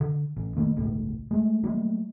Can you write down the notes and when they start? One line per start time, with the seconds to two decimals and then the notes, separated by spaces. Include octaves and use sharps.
0.01 D3
0.36 A1
0.57 D#3 A3 A#3
0.76 G1 C#2 A2
1.31 G#3 A3
1.63 F#3 G3 A3 A#3